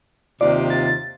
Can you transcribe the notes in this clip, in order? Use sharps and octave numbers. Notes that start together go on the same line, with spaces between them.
D#2 C3 F4 D5
A6